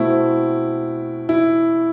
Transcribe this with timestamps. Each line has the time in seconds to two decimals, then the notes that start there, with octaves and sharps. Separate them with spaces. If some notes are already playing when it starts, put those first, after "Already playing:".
Already playing: B2 A3 C4 E4
1.29 E4